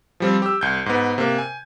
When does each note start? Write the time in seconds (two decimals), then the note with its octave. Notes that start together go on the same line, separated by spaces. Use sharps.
0.20 F3 G3 C4
0.42 G4 E6
0.61 C2 G6
0.86 G#2 B3
1.18 C3 A#3
1.38 G#5